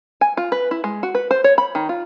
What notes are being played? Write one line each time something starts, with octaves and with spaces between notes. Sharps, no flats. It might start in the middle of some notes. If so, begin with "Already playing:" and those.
G#5
F4
B4
E4
G#3
F#4
B4
C5
C#5
B5
D#3
F4